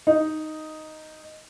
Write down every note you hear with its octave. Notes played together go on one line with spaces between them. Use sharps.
D#4